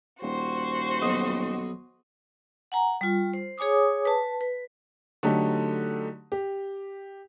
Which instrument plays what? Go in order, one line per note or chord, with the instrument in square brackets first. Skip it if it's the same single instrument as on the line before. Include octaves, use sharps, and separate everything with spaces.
[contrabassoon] D#1 [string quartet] F#4 C5
[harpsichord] B1 B2 D#5
[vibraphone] F#5 G#5 A#5
G3 F4
C5
G#4 C#5 G#5 D6 D#6
B4 A5
B4
[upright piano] D3 F#3 A3 D#4 G4
G4